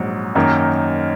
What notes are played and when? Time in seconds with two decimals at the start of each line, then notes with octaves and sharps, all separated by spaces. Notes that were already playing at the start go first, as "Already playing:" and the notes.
Already playing: A#1 G#2 F#3
0.35 F#2 D#3 A#3 D#4